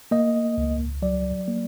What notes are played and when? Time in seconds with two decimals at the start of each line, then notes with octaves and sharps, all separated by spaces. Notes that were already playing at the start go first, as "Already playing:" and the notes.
0.11 A#3 D#5
0.58 C#2
1.02 F#3 D5
1.48 A#3